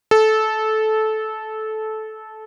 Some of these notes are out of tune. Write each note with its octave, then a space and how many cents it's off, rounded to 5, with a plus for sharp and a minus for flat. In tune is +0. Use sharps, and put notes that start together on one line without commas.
A4 -15